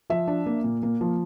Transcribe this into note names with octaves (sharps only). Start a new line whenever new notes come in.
F3 E5
D4
A#3
A#2
A#3
F3